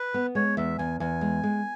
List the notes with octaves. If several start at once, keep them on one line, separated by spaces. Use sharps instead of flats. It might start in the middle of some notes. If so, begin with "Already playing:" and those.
Already playing: B4
B3
G#3 C#5
E2 E5
E2 G#5
E2 G#5
G#3
G#3